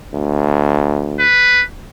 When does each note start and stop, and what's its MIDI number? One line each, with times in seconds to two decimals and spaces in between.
0.14 1.24 38
1.19 1.62 71